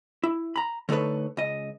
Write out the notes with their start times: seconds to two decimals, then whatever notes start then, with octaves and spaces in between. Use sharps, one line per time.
0.24 E4
0.56 A#5 B5
0.89 D3 A3 D#4 A4 B4 C#5
1.37 C#2 D#5